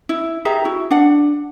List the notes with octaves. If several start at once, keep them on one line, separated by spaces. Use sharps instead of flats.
E4
G4 G#4 E5 A#5
E4 F#4
D4 F#5